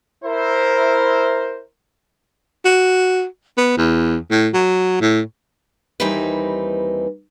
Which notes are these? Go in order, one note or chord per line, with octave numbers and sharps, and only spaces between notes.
E4 A#4 C5
F#4
B3
E2
A2
F#3
A2
D#2 E3 G3 C4 D#4 B4